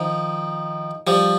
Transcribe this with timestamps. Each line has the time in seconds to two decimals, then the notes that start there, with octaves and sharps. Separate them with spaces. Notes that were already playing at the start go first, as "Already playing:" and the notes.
Already playing: D#3 F3
1.07 F3 G3